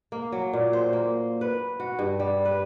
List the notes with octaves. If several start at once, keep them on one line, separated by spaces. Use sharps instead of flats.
A#3
F#3
A#2
C5
A#3
B4
F#4
G2
G3
B4